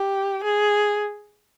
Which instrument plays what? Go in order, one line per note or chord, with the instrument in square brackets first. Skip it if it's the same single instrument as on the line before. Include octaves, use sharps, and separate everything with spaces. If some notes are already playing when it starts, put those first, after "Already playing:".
Already playing: [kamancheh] G4
G#4